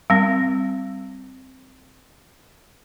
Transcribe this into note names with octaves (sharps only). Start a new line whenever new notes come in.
G3 C4